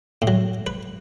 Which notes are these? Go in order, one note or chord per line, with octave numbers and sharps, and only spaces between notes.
A2
F#3
B4